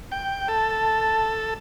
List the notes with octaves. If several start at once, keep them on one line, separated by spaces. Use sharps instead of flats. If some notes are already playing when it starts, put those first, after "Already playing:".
G5
A4 A5